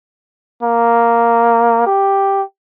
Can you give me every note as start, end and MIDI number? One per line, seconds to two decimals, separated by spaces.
0.63 1.84 58
1.87 2.42 67